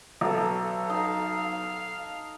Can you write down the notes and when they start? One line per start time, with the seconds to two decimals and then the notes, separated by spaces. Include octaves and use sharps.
0.21 B1 A4 F5
0.90 D#4 F5 A5